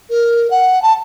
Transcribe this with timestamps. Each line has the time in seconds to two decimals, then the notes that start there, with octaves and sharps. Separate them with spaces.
0.10 A#4
0.51 F#5
0.82 A5